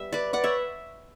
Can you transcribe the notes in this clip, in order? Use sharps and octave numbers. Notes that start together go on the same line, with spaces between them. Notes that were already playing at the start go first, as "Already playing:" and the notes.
Already playing: G3 B3 E5
B4 D5
D5 F#5
C#5 E5